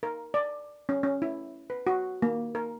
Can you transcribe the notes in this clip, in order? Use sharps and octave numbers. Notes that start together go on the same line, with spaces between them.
A#4
D5
C#4
C#4
E4
B4
F#4
A#3
A#4